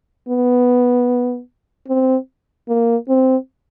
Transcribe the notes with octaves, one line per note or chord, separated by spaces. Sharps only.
B3
C4
A#3
C4